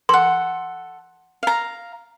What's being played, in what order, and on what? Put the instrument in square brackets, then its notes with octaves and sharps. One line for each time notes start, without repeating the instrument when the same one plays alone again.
[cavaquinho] A4 F#5 [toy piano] C6
[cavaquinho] F5 A#5